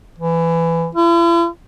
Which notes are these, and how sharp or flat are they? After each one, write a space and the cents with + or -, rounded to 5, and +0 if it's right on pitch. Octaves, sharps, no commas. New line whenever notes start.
E3 +20
E4 +45